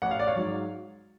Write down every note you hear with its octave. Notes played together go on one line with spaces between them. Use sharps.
A1 F#5
F5
D5
C#5 F5
G#2 F#3